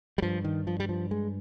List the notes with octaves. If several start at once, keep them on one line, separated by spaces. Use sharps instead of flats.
G3
G2 F3
D#3
F3
G3
F3
G#3